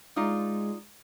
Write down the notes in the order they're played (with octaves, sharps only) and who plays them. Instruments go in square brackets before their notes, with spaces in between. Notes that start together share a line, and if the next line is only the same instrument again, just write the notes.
[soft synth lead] G#3 [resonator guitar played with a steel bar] D#4 F4 D5